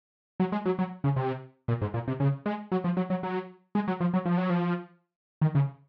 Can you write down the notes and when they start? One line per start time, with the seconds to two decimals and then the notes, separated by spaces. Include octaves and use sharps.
0.40 F#3
0.52 G#3
0.66 F#3
0.79 F#3
1.04 C#3
1.16 C3
1.68 A#2
1.81 G#2
1.94 A#2
2.08 C3
2.20 C#3
2.46 G#3
2.72 F#3
2.84 F3
2.97 F#3
3.10 F#3
3.23 F#3
3.75 G#3
3.88 F#3
4.00 F3
4.14 F#3
4.25 F3
4.38 F#3
4.50 F3
5.41 D#3
5.55 C#3